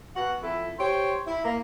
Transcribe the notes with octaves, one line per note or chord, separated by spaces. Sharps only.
B2 F#4 F#5
F2 E4 A4
G4 C5 C#5
E4
A#3